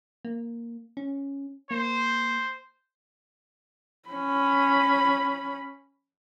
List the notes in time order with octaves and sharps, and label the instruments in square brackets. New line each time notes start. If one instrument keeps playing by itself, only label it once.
[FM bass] A#3
C#4
[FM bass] A#3 [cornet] C5
[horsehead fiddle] C#4 B5